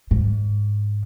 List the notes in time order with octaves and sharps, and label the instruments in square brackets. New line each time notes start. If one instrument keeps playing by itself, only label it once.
[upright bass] G#2